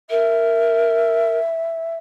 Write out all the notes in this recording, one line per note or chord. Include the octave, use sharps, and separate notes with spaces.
A#4 E5